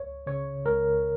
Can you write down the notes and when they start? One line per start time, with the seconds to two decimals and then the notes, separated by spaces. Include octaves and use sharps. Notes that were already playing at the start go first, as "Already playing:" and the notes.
Already playing: C#2 C#5
0.26 C#3 C#5
0.66 C#2 A#4